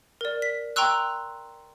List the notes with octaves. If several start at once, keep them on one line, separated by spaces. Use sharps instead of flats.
A#4 D5
B6
G5 A#5 C6 C#6 E6 F#6